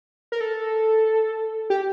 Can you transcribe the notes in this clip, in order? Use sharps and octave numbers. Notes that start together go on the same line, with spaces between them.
A#4
A4
G4